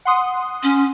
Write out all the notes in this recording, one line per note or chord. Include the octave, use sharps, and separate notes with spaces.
F#5 C6 D#6
C#4